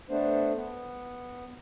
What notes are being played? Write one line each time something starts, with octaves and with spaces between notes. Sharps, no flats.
A3 B3 D4 C5
B3